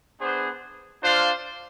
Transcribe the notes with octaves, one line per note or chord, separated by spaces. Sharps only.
B3 D4 G#4 C5
D4 F4 C5 F5